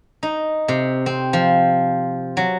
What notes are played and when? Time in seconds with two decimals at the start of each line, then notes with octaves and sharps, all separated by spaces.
0.23 D#4
0.68 C3
1.06 C4
1.33 F3
2.37 F#3